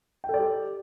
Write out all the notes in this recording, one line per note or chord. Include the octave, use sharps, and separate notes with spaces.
G4 A4 D5 G5